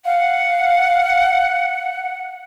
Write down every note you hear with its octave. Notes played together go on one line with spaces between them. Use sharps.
F5 F#5